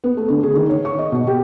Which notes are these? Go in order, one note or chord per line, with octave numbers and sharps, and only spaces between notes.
B3
A3
D3
G#4
D#3
C#5
C#6
D#5
B2
G4